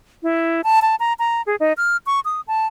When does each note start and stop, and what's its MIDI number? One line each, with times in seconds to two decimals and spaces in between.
0.23 0.61 64
0.64 0.80 81
0.82 0.95 81
1.00 1.13 82
1.19 1.42 82
1.47 1.56 68
1.60 1.73 63
1.77 1.97 89
2.06 2.20 85
2.25 2.41 87
2.48 2.66 81